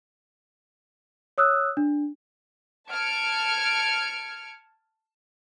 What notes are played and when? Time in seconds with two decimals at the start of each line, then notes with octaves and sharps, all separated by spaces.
1.38 C#5 D#6 E6 F#6
1.77 D4
2.88 A5 F6 G#6 C#7 D7